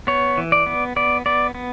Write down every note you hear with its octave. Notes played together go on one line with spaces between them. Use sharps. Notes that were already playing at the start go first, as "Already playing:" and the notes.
B3 C#5
E3
D5
B3
B3 D5
B3 D5
B3